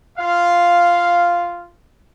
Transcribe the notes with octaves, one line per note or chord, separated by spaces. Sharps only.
F4 F5